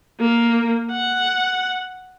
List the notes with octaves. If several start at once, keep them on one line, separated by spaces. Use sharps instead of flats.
A#3
F#5